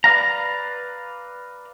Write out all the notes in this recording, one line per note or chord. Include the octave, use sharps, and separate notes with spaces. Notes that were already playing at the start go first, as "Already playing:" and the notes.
B4 D5 F5 A#5